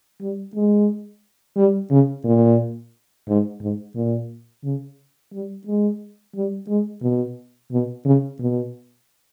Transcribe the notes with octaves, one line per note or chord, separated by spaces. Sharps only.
G3
G#3
G3
C#3
A#2
G#2
G#2
A#2
C#3
G3
G#3
G3
G#3
B2
B2
C#3
B2